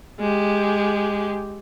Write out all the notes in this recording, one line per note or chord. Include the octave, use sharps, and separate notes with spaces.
G#3 G4